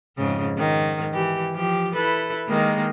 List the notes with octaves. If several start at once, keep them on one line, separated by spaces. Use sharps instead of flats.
F2 G#2 C#3
G#2 D#3
E3 G4
F3 G4
E4 A4 B4
D#3 G#3 A#3